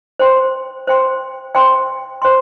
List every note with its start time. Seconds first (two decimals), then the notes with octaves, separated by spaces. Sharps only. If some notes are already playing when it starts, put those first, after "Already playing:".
0.19 C5 G5 C6
0.87 C5 G5 C6
1.55 C5 G5 C6
2.22 C5 G5 C6